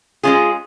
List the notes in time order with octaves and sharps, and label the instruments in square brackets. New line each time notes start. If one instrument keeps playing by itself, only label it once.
[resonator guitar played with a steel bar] G#3 C#4 F4 G#4